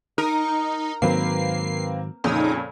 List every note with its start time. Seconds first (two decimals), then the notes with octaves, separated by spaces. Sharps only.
0.18 D#4 A#4
1.02 G#2 D#3 F#3 A#3 C4 B4 C7
2.24 F2 A#2 C#3 D#4